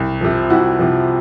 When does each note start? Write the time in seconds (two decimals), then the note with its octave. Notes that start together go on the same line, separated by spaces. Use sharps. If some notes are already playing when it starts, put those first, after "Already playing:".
Already playing: C2
0.21 C3 F3
0.50 C2 E4 F#4
0.79 C3 F3